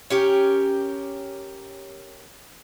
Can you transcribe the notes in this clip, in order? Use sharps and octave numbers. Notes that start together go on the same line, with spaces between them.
C#4 G4 A#4